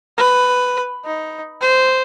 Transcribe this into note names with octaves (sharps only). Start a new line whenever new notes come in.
B4
D#4
C5